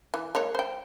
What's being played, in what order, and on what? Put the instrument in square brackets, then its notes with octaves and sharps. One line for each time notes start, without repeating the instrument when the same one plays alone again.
[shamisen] E3
G#3 A#3 C#5
C5 G5